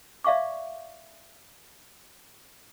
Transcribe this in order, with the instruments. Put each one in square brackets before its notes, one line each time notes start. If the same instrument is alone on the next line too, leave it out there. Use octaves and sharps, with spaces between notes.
[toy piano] D5 E5 F5 C#6 D6